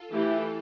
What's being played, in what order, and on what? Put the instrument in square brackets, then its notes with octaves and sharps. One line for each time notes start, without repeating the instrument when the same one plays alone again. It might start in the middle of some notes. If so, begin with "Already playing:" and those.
Already playing: [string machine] F4 A4
[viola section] E3 A3 E4 G4